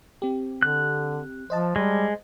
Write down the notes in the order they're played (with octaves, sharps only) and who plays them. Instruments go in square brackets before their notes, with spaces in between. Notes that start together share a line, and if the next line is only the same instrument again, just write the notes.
[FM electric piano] C4 G4
[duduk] D3 [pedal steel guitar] F#6
[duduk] F3 [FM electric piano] C5 D#5 A5
[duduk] G3 [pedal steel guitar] G#3